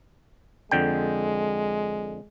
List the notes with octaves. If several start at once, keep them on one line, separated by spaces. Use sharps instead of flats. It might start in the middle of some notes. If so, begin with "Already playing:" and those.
F2 D3 G#3 G5